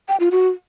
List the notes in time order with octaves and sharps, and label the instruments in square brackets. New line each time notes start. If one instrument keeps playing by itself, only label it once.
[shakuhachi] G5
F4
F#4